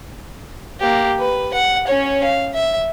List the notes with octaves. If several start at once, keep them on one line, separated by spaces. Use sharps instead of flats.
A#3 G4
B4
F#5
C#4 C#5
F5
E5